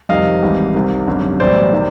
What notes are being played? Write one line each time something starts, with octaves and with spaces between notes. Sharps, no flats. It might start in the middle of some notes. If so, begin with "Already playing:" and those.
F2 C3 D#3 G3 D#5 F5
G#1 G#2 E3 G3
C2 C3 D#3
G#1 F#2 D3 G3
B1 A2 E3 G3 C5 D5
C3 D#3